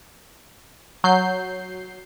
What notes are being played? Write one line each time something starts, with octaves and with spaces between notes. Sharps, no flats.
F#3 G6 C7